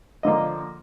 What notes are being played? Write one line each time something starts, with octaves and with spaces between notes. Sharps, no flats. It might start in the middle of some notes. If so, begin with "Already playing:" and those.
D3 F3 A#3 D#5